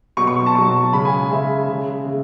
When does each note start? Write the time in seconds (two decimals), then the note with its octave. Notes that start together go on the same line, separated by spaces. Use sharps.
0.17 B2 F#3 C#6
0.27 C#6
0.46 A5
0.55 B2 F#3 C#6
0.92 C#3 G#3 B5
1.05 G#5
1.31 C#3 G#3 E5
1.69 C#3 G#3
2.06 C#3 G#3